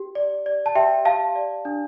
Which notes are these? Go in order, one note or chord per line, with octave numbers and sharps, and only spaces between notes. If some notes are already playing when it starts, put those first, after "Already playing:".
Already playing: G4
D5
D5
A5
G4 E5 G5
G4 F5 A5
D5
D4